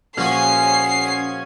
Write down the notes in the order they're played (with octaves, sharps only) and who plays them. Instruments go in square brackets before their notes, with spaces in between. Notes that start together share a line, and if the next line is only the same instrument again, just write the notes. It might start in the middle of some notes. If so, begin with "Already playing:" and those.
[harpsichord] A#2 F3 F#4 [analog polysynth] C#4 G#5 [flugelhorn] G#4 [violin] C7